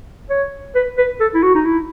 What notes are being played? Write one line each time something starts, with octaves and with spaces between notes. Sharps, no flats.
C#5
B4
B4
A4
E4
F#4
D#4
E4